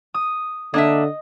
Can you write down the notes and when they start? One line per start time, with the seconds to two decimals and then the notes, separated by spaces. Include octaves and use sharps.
0.14 D#6
0.74 D3 A#3 D4 D#5 E5